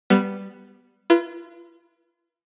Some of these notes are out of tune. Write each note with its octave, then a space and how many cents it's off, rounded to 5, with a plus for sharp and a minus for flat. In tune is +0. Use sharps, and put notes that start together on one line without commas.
G3 +0 B3 +0
F4 -40 B4 -25